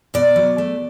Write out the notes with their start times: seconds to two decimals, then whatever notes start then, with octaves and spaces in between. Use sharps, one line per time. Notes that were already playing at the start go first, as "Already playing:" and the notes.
0.14 B2 D5
0.36 F#3
0.58 A3